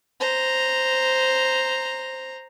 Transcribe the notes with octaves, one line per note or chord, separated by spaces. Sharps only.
C5 A#5